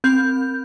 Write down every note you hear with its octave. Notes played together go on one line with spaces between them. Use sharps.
C4 G6